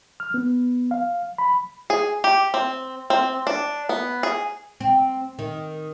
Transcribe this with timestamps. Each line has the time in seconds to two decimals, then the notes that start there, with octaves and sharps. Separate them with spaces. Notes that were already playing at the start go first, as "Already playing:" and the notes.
0.20 F6
0.34 B3
0.91 F5
1.38 B5
1.90 G#4
2.24 G4
2.54 C4
3.10 C4
3.47 D4
3.89 B3
4.23 G#4
4.80 C4
5.39 D#3